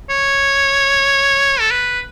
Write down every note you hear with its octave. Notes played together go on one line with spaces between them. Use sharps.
C#5
A4
B4